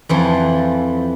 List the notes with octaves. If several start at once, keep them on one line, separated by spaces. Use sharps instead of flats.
F2 E3 F3